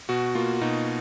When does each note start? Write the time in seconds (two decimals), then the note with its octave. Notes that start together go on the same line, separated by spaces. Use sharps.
0.09 B2 F#4
0.35 A#3 F4
0.61 B2 D#4